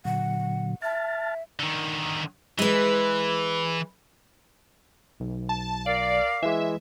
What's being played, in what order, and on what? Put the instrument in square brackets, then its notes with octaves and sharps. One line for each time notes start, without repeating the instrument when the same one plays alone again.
[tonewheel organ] A#2 D3 F#3 [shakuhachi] F#5
[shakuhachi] E5 [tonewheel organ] A5 F6 A6
[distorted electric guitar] D3 D#3
[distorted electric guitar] E3 [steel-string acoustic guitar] G#3 B4
[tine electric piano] B1
[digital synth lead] A5
[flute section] A#4 F5 D6 [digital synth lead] D5
[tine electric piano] E3 G#3 [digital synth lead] E5